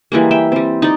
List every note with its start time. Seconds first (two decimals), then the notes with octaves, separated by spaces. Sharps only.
0.12 E3 G3 G#3 A#3
0.31 E5 G5
0.52 G3 C4
0.82 D#4 D5